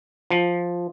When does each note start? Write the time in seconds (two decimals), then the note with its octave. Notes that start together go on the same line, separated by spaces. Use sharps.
0.30 F3